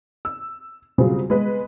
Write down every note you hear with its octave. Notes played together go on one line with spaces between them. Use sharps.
E6
C#3 F#3 G3 C4 F4 G#4
G#3 B3 B4